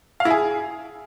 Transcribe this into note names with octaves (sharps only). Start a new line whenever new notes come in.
F5
E4
G#4